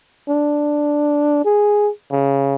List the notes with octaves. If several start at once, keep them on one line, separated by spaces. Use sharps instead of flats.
D4
G#4
C#3